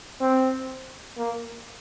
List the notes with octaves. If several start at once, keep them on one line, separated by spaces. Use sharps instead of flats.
C4
A#3